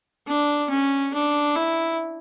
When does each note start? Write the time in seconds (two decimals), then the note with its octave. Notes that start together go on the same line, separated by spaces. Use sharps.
0.27 D4
0.70 C#4
1.14 D4
1.55 E4